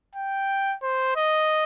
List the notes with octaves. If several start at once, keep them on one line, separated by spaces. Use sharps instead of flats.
G5
C5
D#5